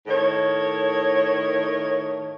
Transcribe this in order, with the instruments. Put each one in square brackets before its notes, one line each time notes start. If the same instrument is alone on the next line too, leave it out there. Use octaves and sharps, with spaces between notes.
[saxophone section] A2 D#3 C#5